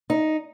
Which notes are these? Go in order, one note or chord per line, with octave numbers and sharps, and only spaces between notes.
D#4